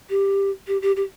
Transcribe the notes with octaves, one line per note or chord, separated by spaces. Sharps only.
G4
G4
G4
G4